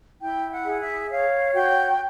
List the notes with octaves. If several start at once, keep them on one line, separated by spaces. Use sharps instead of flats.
E4 G5
F#5
G#4
E5
C#5 F5
F#4 G5